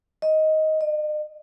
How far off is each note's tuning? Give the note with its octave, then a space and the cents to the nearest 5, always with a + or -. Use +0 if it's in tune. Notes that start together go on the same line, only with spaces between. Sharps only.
D#5 +10
D#5 -45